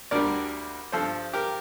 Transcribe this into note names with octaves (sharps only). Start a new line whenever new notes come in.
D2 D3 G3 A#4 D5
G2 F3 A4 C5
G4 A#4